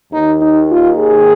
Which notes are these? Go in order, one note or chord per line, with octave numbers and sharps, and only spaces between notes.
D#2 D#3 D#4
D#4
F4
G#4